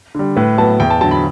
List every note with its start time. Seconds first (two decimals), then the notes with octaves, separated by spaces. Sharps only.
0.15 D3 G3
0.36 A2 B4
0.58 F#3 B3 A5
0.80 E2 G5
0.90 A5
1.01 D3 F#3 A5
1.11 B5